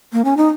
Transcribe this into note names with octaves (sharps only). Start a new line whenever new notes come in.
A#3
C#4
D#4